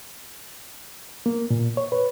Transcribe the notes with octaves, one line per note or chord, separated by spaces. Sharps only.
A#3
A#2
C#5
B4